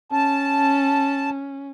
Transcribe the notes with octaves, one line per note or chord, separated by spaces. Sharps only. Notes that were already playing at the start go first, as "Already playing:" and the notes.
C#4 A5